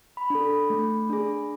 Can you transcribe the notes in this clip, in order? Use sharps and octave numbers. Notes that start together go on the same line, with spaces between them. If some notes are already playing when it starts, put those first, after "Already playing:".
B5
D4 A4
B5
A3
D4 G#4